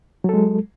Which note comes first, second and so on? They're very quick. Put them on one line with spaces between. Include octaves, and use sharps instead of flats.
F#3 A4 G#3